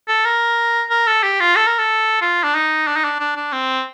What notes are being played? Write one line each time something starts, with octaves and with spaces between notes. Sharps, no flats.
A4
A#4
A#4
A4
G4
F4
A4
A#4
A4
F4
D4
D#4
D4
D#4
D4
D4
D4
C4